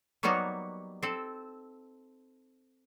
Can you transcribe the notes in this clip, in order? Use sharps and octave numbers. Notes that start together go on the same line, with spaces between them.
F#3 G3 A#3 B3 D#4 F#4
C4 A4